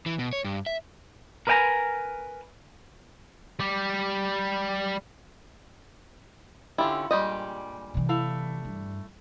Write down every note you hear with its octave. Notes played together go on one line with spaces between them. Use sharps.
E3
B2
C#5
G2
E5
A#4 B4 D#5 G5 G#5 A#5
G3 G4
D3 C#4 E4 F4 G4
G2 A#2 G3 G#3 G4 D#5
C3 E3
A3 E4 F5
G2